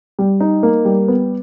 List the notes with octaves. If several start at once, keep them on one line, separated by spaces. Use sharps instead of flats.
G3
D#4
A#3
G3
B3